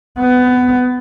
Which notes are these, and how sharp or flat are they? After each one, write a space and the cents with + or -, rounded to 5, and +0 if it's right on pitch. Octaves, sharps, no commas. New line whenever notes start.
B3 +20